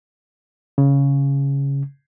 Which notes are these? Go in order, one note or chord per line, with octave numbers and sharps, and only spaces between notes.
C#3